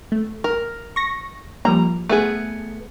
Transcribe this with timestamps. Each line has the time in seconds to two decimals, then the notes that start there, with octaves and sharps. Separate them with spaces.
0.12 A3
0.44 A#4
0.96 C#6 A#6
1.65 F3 G3 A#3 A#5
2.09 A3 B3 G#4